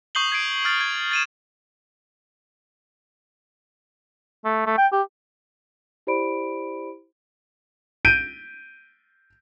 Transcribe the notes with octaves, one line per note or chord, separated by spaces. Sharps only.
C#6 D#6 G6 C7 F#7 G7
G#6 C7 D7
D#6 F6 A6
G#6
A6 D#7 E7
A3
A3
G5
G4
E4 G4 C5 D5 B5 D7
G6 D7 D#7